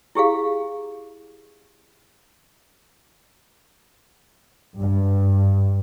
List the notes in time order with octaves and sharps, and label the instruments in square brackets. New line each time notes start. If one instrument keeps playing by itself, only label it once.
[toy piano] E4 G4 G#4 F5
[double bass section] G2